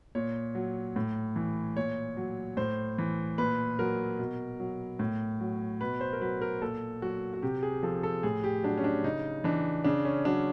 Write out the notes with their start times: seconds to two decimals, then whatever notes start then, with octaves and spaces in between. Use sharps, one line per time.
0.15 A#2 C#5
0.55 F#3
0.96 A2
1.36 E3
1.77 A#2 C#5
2.17 F#3
2.57 A2 C5
2.98 E3
3.38 A#2 B4
3.79 F#3 A#4
4.19 B2
4.60 F#3
4.99 A2
5.40 F#3
5.81 B2 B4
6.01 C5
6.13 A#4
6.21 F#3 B4
6.42 A#4
6.62 A#2 A4
7.02 F#3 F#4
7.34 F#4
7.42 C3 G4
7.63 G#4
7.83 F3 A4
8.03 A4
8.23 A2 G#4
8.44 G4
8.64 F#3 D4
8.78 C#4
8.84 D4
9.04 C#3 D#4
9.44 E3 D4
9.84 C#3 D4
10.05 C#4
10.25 F#3 D4